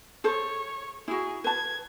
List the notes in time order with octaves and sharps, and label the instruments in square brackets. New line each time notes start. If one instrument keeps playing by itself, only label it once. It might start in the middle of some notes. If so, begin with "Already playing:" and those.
[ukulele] G#4 A4 C5 [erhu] C#5
[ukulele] E4 F#4 [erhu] G#4
[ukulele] B4 A5 [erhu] G#6